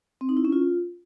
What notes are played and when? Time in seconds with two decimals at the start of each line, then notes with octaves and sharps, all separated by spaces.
0.21 C4
0.29 D#4
0.37 E4
0.45 C#4
0.52 F4